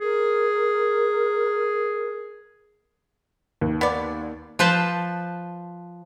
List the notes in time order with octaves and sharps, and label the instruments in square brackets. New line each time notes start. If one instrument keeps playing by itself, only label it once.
[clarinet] G#4 [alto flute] A#4
[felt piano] D#2
[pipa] B3 D5
[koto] F3 B4 C5 A5